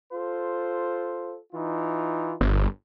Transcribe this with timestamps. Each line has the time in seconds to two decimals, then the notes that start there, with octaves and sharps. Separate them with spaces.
0.12 F4 A4 C5
1.52 E3 D#4 F4
2.41 G1